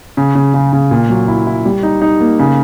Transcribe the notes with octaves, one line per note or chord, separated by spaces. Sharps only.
C#3
C#3
C#3
C#3
A#2
F#3
E4
E4
G3
D#4
D#4
A#3
C#3